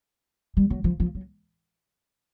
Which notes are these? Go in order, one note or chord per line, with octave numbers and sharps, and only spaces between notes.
G3
F#3
F3
F3
F#3